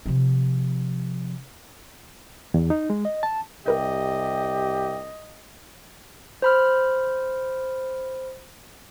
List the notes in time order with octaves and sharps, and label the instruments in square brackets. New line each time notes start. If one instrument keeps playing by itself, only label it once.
[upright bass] C3 F3
[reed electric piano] E2
D#4
G#3
D#5
A5
[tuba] C2 [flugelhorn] G4 [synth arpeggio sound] A#4 B4 G6 [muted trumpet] D#5
[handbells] C5 B5 F6